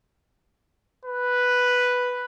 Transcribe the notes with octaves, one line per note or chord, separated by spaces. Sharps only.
B4